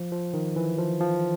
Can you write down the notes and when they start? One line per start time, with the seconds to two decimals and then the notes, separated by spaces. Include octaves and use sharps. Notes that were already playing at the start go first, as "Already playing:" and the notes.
Already playing: F3
0.12 F3
0.34 D#3
0.56 E3
0.78 F3
1.01 F3